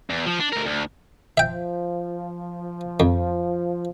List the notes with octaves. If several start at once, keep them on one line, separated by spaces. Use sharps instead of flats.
E2
F3
D4
D2 A#4
D2
F3 E5 G5
F2